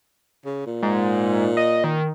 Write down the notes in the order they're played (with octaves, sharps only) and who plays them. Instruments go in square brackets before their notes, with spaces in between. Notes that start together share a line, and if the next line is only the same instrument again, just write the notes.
[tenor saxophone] C#3
A#2
[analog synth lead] G#2
D#5
D#3